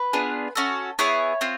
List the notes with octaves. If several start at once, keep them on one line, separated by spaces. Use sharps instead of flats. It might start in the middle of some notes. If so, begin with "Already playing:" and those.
Already playing: B4
B3 D4 F4 G#4
C#4 F#4 A4
B3 E4 G#4 C#5
C4 F4